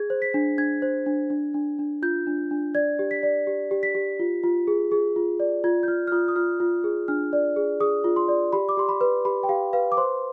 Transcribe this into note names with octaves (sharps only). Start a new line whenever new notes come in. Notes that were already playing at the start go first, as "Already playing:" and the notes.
Already playing: G#4 G#6
C5
B6
D4
D4 G#6
C5
D4
D4
D4
D4
F4 G6
D4
D4
D5 G#6
G4
B6
D5
G4
G4
B6
G4
F4
F4
G#4
G#4
F4
D5
F4 G#6
G6
F4 F6
F6
F4 D#6
D#6
F4 F6
F4
G#4
D4 F6
D5
G#4
G#4 D#6
F4
C6
D5
G4 B5
D6
G4 C6
B5
B4
G4 B5
G5
G4 F5
B4 F5
D6
C5 C6